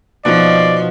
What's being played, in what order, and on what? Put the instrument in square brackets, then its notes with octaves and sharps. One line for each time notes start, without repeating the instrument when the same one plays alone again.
[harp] B2 D#4 [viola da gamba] F3 [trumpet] D5